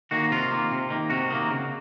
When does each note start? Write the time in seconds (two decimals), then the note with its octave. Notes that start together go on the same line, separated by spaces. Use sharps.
0.11 D#3 A#3 F#4
0.31 C3 F4
0.52 D#3 A#3
0.71 C3
0.90 D#3 A#3
1.10 C3 F#4
1.30 D#3 A#3
1.50 C#3